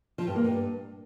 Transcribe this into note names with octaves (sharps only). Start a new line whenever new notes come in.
F3
G2
A#3
G2